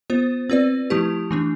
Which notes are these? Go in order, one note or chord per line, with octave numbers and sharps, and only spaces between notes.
B3 F4 C5
C4 F4 B4 D5
F3 A3 E4 G4
E3 A3 D4